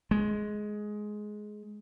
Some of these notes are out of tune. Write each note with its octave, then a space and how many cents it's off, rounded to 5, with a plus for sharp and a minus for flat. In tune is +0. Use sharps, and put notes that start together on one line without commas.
G#3 +15